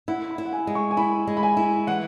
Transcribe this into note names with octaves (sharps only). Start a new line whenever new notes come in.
E4 F#5
B5
E4
F#5
G#5
G#3
C#6
G#5
E4 B5
G#3
B5
G#5
E4
E3 F#5